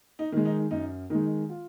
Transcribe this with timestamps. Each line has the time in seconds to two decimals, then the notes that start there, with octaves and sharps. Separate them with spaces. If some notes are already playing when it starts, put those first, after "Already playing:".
0.19 D#4
0.32 D#3 G#3
0.45 D#4
0.71 F#2 D#4
1.10 D#3 G#3 D#4
1.50 F4